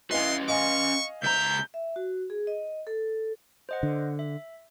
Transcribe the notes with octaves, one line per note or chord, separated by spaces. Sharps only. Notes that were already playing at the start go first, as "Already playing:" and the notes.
C#4 E4 B4 D#5 F5 C6
D#5 F5 G#5 C#6
C#2 E5 A#5 G6
E5
F#4
G#4
D#5
A4
C5 D#5 F#5
D3
E5